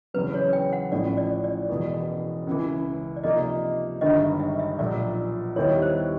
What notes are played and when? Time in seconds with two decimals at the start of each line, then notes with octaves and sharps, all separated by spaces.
0.14 E2 C#3 F#3 B4
0.34 C#5
0.53 G5
0.73 F#5
0.92 A1 A2 F3 D5
1.17 D5
1.44 D5
1.69 E1 E2 B2
2.47 C#2 C#3 E3
3.17 D5
3.24 C3 F3 A#3 D#4 D#5
4.01 G1 G2 D#3 G#3 D#5
4.21 E5
4.40 E5
4.59 E5
4.79 B1 A#2 F3 D5
5.56 D#2 D#3 G3 B3 E4 C#5
5.82 C5